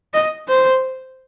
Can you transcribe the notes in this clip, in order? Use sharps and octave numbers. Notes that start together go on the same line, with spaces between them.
D#5
C5